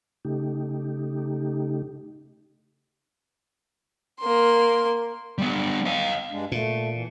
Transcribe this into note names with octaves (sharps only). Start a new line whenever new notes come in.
C#3 A3 D#4 G4
A#3 C6
G3 B3
D#5 F5
G2 G#3 D4
A#2 A3
E3